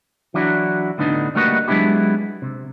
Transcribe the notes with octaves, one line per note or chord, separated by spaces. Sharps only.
E3 F#3 D4 E4 F#4
A2 D3 B3 D4 D#4
G3 A3 A#3 F#4 B4 D#5
F#3 G#3 B3 D4 E4 G4
C3